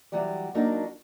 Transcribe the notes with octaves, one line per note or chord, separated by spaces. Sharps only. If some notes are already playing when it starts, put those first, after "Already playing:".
E3 F#3 G3 D5
F#3 A#3 D4 D#4 F#4